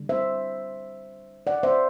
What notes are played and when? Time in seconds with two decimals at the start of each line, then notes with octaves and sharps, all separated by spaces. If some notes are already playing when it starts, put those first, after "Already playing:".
Already playing: D3 G3
0.09 C5 E5
1.47 D5 F#5
1.63 C5 E5